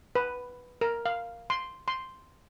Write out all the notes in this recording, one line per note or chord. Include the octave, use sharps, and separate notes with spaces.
B4
A#4
F5
C6
C6